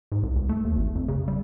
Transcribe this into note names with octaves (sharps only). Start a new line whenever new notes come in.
G#2
C2
C#2
A3
D#2
G#1
F2
C#3
G3